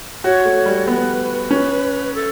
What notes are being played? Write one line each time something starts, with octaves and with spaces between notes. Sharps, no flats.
F#4 C#5
A3
G3
B3 B4
C#4
A4